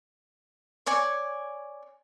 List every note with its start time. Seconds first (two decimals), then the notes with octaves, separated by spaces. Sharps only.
0.86 C#5 D5 G#5 C#6